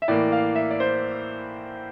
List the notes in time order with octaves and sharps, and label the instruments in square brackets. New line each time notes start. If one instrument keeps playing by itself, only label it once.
[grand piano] E5
A2 E3 A#3 D5
F5
E5
D5
C5